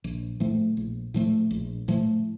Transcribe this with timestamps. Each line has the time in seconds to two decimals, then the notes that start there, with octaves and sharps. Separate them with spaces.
0.04 A#1
0.40 A2 F3 A3
0.77 A#1
1.14 A2 F3 A3
1.51 A#1
1.88 A2 F3 A3